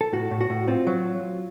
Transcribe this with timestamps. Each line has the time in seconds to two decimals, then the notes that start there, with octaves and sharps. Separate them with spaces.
0.01 A4
0.13 A2 F#4
0.31 A2
0.41 F#4
0.50 A2
0.68 C4 F4
0.87 F#3